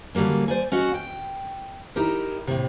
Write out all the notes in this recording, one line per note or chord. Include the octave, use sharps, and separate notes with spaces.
D3 F#3 G3 A#3 C#4
C5 D5 G#5
C#4 F#4 D#5 F#5
G5
D#4 E4 G4 A#4
A2 C3